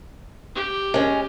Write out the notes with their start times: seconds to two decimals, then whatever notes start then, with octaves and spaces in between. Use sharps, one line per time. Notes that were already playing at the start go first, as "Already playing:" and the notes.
0.55 G4
0.94 G#3 C#4